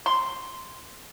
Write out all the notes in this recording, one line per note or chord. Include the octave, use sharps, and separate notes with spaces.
C6